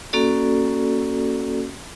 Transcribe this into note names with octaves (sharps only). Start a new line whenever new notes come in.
A#3 C#4 F#4 A4 D5